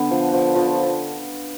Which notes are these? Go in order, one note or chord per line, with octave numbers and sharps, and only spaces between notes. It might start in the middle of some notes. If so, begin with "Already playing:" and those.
Already playing: D3 B3
F3
F3
F3